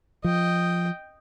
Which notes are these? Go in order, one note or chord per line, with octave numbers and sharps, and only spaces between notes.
F3 D#5 G5